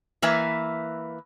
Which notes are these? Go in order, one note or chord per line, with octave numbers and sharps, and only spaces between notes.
E3 A#3 B4 E5 G#5